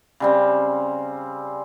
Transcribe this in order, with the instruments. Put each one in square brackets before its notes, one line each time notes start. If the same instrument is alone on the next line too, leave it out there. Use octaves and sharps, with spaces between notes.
[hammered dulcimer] C#3 G3 C4